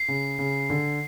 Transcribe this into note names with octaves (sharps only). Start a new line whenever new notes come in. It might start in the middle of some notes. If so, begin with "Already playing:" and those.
Already playing: C7
C#3
C#3
D3